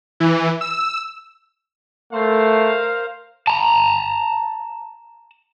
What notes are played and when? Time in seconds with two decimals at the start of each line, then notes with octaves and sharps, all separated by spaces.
0.20 E3
0.61 E6
2.13 A3 A#4 C5 F5
3.48 A5 A#5